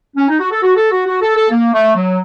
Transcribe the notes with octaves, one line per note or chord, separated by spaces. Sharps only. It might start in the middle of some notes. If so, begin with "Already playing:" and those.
C#4
D#4
F#4
A4
F#4
A4
F#4
F#4
A4
A4
A#3
A3
F#3